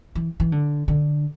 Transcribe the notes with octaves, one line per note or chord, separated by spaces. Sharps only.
E3
E3
D3
D3